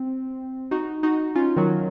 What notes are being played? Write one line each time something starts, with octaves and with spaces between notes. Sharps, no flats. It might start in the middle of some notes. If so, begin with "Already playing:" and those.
Already playing: C4
D#4 F#4
D#4 F#4
C#4 F4
D#3 F#3